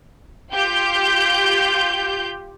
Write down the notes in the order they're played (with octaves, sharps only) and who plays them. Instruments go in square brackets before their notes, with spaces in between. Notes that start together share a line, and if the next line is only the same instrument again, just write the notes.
[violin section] F4 G4 G6